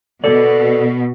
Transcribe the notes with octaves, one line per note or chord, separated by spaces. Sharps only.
B2 A4 D5